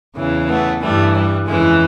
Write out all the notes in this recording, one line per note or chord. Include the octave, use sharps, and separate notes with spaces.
E2 C#3 E3
A3 B3
G2 E3 G3 A3
G3
F2 C#3 E3 G#3